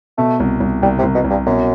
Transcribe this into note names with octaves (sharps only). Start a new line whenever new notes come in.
B2 A3
C2
C2
C2 G3
C3
C2
B2
C2
G2
F#2 B2